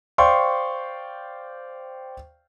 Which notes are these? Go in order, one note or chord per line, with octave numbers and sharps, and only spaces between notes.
C5 D5 F5 G5 C6 C#6